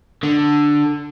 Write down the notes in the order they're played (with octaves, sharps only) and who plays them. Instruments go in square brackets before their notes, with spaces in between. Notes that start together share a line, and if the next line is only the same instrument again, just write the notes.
[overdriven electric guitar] D3